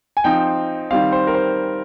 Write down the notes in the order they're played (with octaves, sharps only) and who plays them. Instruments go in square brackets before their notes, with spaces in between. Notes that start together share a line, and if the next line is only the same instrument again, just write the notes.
[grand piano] G#5
F3 C4 D#4 G5
D#3 G3 C4 F5
C5
A#4
C5